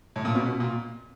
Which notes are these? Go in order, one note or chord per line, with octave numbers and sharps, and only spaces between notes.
A2
A#2
B2
B2
A#2